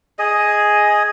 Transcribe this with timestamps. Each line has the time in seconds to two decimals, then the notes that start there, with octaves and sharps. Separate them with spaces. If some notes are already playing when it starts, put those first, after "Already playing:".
0.19 G#4 D#5